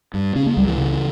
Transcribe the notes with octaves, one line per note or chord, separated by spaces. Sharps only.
G2
C#3 C#4
A#3
C#2 G3
E3
C#3